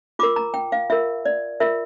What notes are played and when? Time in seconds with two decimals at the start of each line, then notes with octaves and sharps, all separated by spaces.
0.19 F4 A#4 D6
0.36 A#5
0.54 G5
0.72 F5
0.90 F4 A#4 E5
1.26 D5
1.60 F4 A#4 E5